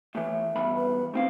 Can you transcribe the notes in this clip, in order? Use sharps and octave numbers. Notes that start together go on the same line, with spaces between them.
A2 E3 E5
E2 G2 B5
B4
A3 C4 C5 F5